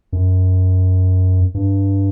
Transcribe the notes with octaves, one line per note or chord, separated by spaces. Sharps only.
F#2
G2